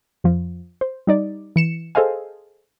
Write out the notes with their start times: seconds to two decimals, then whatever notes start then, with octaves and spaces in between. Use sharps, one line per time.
0.24 F2 F3
0.81 C5
1.07 G3 D#4 D5
1.56 E3 C#7 E7
1.95 G#4 A4 C5 D#5 F5 G#5